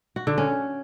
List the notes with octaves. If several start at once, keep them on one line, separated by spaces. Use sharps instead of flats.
F#4
D3
C#4